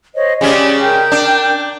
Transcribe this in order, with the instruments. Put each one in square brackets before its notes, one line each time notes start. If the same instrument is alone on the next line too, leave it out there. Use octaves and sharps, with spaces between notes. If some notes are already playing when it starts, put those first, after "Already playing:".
[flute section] C5 C#5 D#5
[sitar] C#3 G#3 C#4 [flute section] G4 D5
[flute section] A#4 G5 G6
[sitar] D4